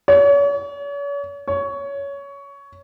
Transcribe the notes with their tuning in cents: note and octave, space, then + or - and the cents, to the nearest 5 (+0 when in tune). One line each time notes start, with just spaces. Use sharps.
C#5 +40
C#5 +15